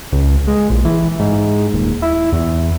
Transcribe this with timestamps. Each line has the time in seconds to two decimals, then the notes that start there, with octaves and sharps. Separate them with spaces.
0.12 C#2
0.47 G#3
0.70 A#1
0.85 E3
1.19 G#2
1.73 D#1
2.02 E4
2.32 E2